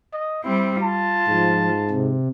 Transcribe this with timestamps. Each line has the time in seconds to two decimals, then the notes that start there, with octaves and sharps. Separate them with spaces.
0.13 D#5
0.44 G3 C4 E4
0.83 F4 A5
1.28 G#2 F3
1.90 C3